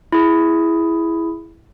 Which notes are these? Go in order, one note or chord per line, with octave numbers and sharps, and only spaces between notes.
E4 G#4